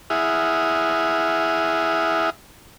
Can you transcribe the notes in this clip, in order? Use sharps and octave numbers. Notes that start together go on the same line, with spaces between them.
E4 G#4 E5 F#5 D#6 F6